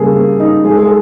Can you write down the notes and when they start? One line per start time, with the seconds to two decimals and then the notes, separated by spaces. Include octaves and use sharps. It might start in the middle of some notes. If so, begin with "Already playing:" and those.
Already playing: C#3 G3 A#3 G#4 A4
0.15 A#3
0.40 D#4
0.64 G#3 G#4
0.71 A4
0.79 G#4
0.86 A4